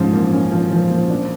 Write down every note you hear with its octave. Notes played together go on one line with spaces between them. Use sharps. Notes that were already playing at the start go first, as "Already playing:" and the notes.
Already playing: G#2 F3 C#4
A#3
C#4
F3
F3
A#3
D4